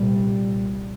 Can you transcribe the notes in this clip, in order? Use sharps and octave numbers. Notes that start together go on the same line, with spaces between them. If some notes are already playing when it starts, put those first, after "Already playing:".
Already playing: C2 A#2 G3